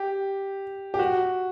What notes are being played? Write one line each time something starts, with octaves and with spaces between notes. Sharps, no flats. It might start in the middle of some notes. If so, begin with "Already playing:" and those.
Already playing: G4
G4
F#4